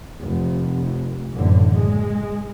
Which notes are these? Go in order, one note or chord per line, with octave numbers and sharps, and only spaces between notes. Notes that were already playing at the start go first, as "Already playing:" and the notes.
F1
F#1 A2 D3 E3
G#3